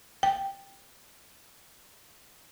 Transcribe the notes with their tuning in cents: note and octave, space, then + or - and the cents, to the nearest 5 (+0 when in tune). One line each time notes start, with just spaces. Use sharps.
G5 +5